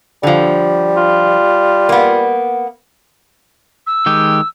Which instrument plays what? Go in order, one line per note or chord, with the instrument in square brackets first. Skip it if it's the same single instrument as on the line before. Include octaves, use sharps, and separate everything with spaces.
[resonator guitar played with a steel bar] D3 F3 [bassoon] G3
[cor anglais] F4
[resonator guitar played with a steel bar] A#3 B3
[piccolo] E6
[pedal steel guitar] D#3 G#3 G4